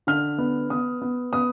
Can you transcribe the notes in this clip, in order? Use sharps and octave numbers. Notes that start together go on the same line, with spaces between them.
D3 F6
B3
B3 D#6
B3
B3 D#6